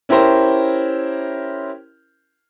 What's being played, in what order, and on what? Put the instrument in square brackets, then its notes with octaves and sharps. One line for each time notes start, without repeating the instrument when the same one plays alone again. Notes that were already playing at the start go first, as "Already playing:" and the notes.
[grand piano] C#4 E4 G4 A#4 C5